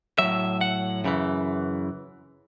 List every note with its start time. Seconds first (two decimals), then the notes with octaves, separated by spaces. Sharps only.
0.18 A2 F#3 E5
0.61 F#5
1.04 F#2 C#3 E3